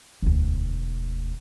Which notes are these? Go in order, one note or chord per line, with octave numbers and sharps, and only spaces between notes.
E1 D2